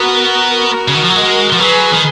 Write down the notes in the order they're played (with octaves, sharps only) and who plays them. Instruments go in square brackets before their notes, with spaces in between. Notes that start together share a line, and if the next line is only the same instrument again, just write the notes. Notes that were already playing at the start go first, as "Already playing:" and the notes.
Already playing: [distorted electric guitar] B3 [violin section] F#4 A#4
[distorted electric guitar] C#3
D#3
F3
F#3
[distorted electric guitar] G#3 [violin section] F#4 A#4
[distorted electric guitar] F3
[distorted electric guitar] F#3 [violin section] G#4 B4
[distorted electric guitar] D#3